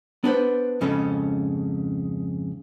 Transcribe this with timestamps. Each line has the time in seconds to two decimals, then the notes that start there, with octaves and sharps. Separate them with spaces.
0.24 B3 D4 B4 C5
0.81 F2 G#2 C#3 C#4 A4 B5